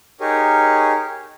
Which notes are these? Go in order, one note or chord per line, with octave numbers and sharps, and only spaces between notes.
D#4 G4 G#4 A#4 C#5